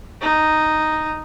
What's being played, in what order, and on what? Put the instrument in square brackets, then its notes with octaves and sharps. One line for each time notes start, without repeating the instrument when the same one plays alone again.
[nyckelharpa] D#4